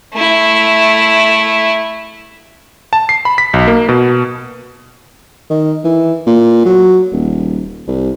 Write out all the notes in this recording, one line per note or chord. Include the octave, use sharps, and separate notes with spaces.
A3 E4
A5
C7
B5
B6
B1
A#3
B2
D#3
E3
A#2
F#3
D#1
C2